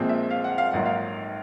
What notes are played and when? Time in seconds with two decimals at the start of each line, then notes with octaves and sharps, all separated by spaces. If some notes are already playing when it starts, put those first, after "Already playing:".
Already playing: A#1 A#2 F3 G#3 C4
0.09 E5
0.31 F5
0.44 F#5
0.58 F5
0.72 A#1 G#2 D#3 F#3 F#5
0.86 F5